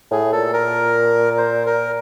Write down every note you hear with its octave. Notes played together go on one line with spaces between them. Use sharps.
A2 G#4
A#2 A4
A#4
C5
A#4